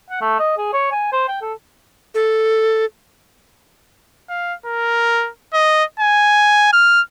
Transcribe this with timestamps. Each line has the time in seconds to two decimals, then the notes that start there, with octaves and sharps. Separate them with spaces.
0.10 F#5
0.21 A3
0.39 D#5
0.58 G#4
0.73 C#5
0.92 G#5
1.12 C5
1.28 G5
1.41 A4
2.15 A4
4.29 F5
4.66 A#4
5.54 D#5
6.00 G#5
6.73 F6